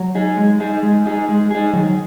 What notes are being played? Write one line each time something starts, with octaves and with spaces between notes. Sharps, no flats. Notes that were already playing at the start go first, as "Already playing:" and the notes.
Already playing: F#3
D#4 G#4
G#3
D#4 G#4
G#3
D#4 G#4
G#3
D#4 G#4
D#3 F#3